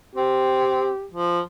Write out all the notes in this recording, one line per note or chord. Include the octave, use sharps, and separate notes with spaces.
C4 G4
F3